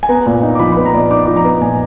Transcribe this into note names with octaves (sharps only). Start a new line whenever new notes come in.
G#5
B3 A#5
A#2
D#4
D6
F3 B5
B5
B3
A#5
A#2 D5 D#5
D#4 D6
F3 D6
A#5
B3
A#2 G#5